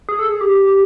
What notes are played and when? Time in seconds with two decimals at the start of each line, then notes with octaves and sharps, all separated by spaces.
0.09 G#4
0.19 A4
0.29 G#4
0.41 G4